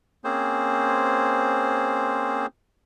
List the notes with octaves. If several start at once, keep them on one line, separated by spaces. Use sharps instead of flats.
A#3 C4 C#4 G#4 C5